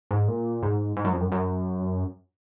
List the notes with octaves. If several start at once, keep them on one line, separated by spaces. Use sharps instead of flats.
G#2
A#2
G#2
G#2
F#2
F2
F#2
F#2